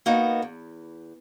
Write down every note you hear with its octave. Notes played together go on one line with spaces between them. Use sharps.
A#3 B3 D#4 F#4
E2